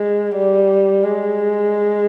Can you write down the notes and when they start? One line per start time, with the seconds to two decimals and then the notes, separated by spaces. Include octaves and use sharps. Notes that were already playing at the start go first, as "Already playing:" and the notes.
Already playing: G#3
0.35 G3
1.03 G#3